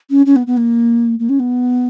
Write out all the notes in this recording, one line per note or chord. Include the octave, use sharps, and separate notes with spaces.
C#4
C#4
B3
B3
A#3
A#3
C#4
B3